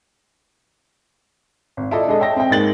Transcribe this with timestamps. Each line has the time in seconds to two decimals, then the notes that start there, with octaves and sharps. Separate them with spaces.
1.77 G#1
1.91 E4 F4 A4 D5 D#5
2.07 G#3 D4 G#4 A4 D#5
2.20 C#5 E5 G5 A5 A#6
2.36 C4 G5
2.50 G#2 G#3 A#3 A6 F#7 G7